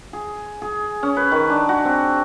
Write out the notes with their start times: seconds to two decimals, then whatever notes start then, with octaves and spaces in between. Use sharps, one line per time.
0.13 G#4
0.62 G#4
1.03 C#4
1.17 B4
1.32 D#3
1.50 D4
1.69 F#4
1.85 C4